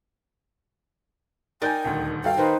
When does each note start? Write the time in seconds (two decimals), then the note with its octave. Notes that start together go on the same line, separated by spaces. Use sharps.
1.62 D#4 A#4 D5 G5 G#5 G6 A6
1.85 D#1 D2
2.24 G2 F#4 A4 F5 G5
2.38 D#3 A#3 D#4 B4 C5